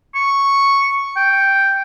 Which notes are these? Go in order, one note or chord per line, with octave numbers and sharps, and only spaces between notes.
C#6
G5